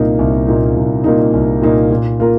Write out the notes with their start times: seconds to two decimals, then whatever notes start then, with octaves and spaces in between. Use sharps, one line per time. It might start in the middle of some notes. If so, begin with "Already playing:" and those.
Already playing: C2 A#2 A#3 D#4
0.19 C2
0.47 A#2 A#3 D#4
0.76 C2
1.04 A#2 A#3 D#4
1.33 C2
1.61 A#2 A#3 D#4
1.91 A#2
2.19 A#3 F4 A#4